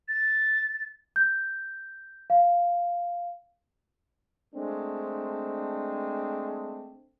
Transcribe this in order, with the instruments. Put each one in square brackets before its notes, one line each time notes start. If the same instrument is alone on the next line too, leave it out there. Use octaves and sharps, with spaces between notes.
[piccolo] A6
[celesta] G6
F5
[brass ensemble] G#3 A3 C4 D4